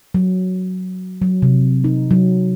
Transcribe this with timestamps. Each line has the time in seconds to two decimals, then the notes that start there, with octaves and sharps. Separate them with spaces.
0.14 F#3
1.22 F#3
1.42 C3
1.84 D#4
2.11 F#3